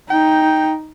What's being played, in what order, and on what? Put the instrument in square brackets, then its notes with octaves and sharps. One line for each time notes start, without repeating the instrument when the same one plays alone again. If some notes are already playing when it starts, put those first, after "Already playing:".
[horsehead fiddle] D#4 [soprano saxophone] G5